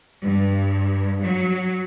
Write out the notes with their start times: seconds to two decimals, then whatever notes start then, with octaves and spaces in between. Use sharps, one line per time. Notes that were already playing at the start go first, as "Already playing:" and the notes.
0.22 G2
1.22 F#3